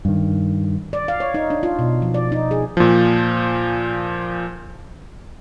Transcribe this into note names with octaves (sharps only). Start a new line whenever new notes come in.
G2 D#3
D5
F5
C#5
D#4
D4
F4
B2
F3
D5
D#4
G#4
A#2 F3